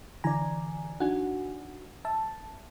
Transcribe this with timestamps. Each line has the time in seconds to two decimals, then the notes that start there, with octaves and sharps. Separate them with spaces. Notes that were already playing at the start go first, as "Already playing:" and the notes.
0.24 D3 E3 D5 G#5 A#5
1.00 D4 D#4 F#4 F#5 G#5
2.05 E5 A5